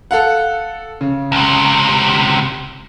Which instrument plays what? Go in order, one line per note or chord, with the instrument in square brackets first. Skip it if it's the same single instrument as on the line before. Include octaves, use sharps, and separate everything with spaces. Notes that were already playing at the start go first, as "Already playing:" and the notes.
[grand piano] A4 F5 F#5
C#3
[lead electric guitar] C#2 C3